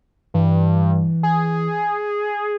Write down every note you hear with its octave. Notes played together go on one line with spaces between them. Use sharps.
G2 E3
G#4